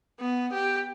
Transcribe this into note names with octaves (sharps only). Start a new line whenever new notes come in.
B3
G4